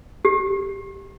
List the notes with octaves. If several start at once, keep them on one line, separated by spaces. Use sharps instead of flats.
G4